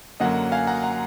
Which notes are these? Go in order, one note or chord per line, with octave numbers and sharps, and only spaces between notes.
F#2 D3 F#3 A#3 D#5 F#5
F5 G#5
F#5 A#5
F#5 A#5